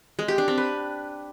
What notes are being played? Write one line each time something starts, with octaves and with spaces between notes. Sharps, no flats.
G#3
G4
D4
C4
B4